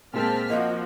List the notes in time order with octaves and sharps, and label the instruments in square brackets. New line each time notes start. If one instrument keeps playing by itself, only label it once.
[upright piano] A#2 G#3 A#3 [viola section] C4 [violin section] A5 F6 B6
[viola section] F3 [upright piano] A#3 [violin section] F#4 [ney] D#5